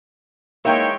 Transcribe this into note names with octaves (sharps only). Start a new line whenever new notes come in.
E3 G#3 A#3 D#4 C#5 E5 G5